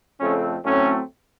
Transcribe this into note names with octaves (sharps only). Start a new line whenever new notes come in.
F2 C#3 A3 C4 C#4
A2 F#3 A3 C4 C#4